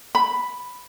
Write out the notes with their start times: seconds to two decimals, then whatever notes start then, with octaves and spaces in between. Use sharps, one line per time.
0.15 B5